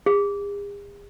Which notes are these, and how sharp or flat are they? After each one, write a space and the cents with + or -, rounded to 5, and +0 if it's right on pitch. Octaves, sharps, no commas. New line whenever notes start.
G#4 -45